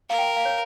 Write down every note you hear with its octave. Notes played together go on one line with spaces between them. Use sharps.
A#4 F5
G5
F5
C#5